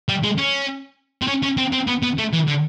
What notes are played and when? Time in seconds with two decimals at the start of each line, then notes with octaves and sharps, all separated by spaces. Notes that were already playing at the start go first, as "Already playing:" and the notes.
0.09 G3
0.23 G#3
0.38 C#4
1.22 C4
1.28 C#4
1.43 C#4
1.58 C4
1.73 C4
1.88 B3
2.03 B3
2.18 A3
2.33 E3
2.47 D3